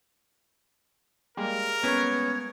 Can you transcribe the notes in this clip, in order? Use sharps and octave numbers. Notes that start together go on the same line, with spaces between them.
G3 G#3 A#3 A#4
B3 C#4 C#5